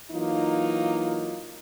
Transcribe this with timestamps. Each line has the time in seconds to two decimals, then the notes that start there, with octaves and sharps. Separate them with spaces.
0.11 E3 F#3 A#3 D#4 F4